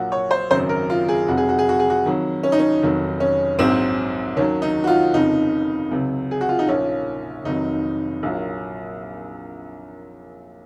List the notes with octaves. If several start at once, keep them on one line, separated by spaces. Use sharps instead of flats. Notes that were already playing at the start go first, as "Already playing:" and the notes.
Already playing: A#1 A#2 F#3 F#4
C#5
C5
G#1 F#2 C#3 F#3 C5
A#4
F4
G#4
F1 F2 C3 F#3 F#4
G#4
F#4
G#4
F#4
G#4
F#4
F2 D#3 F#3
C#4
D#4
C#4
F1 F2 D#3 F#3
C#4
A#1 G#2 F#3 C4
D#2 D#3 F#3 C#4
D#4
F#4
F4
F1 F2 C#3 F3 D#4
C#2 C3 F#3
G#4
F#4
F4
D#4
A#1 A#2 F3 C#4
F1 F2 C3 D#3 F#3 D#4
A#1 A#2 F#3